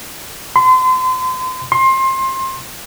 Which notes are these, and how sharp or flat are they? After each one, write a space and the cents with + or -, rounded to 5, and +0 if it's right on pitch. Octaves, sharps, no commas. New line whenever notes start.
C6 -35
C6 +25